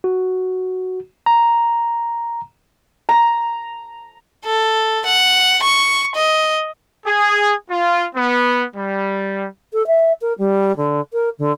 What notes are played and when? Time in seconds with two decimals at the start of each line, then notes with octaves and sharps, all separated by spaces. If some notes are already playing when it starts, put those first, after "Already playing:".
0.04 F#4
1.26 A#5
3.09 A#5
4.45 A4
5.05 F#5
5.63 C#6
6.15 D#5
7.04 G#4
7.70 F4
8.15 B3
8.76 G3
9.73 A4
9.87 E5
10.21 A#4
10.38 G3
10.77 D3
11.13 A#4
11.39 D3